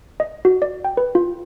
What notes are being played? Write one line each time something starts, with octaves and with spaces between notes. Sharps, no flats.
D#5
F#4
D5
G5
B4
F4